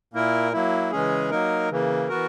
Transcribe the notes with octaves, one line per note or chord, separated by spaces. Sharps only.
A#2 A#3 E4 A#4
F#3 A#3 E4
C#3 E3 G#3 C#4 G#4
F#3 A#3 D#4 A#4
C#3 E3 A#3
E3 B3 F#4 A#4